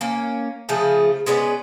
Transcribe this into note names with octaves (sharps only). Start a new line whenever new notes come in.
A#3 C#4
C#3 F3 A3 G#4
G#3 B3 C#4 D5